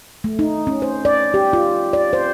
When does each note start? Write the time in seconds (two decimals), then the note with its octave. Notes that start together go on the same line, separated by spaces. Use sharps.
0.24 A3
0.39 D#4
0.67 C#4
0.82 C5
1.05 D5
1.34 G4
1.53 F4
1.93 D5
2.13 C5